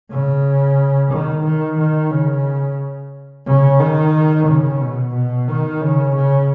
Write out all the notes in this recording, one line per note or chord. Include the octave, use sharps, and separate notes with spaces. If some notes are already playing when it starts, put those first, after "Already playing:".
C#3
D#3
D#3
D#3
C#3
C#3
D#3
C#3
B2
B2
D#3
C#3
C#3